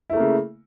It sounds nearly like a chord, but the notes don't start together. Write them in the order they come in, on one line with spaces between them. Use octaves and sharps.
E4 A3 A#3 C#3